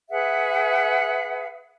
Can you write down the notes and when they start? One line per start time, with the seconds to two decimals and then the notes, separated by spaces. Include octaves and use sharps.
0.10 G#4 B4 E5 F#5